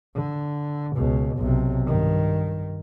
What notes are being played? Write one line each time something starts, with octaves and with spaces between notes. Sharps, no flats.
D3
C#2 B2
B1 C3
G2 D#3